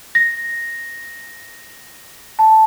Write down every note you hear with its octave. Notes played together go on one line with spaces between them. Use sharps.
A#6
A5